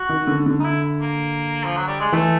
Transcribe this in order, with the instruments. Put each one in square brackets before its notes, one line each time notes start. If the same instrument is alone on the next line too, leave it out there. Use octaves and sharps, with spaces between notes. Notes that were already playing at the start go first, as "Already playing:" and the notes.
Already playing: [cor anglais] F#4
[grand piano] D#3
D3
D3
[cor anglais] D#4
E4
A#3
F3
F#3
G3
G#3
[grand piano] E3 [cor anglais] A3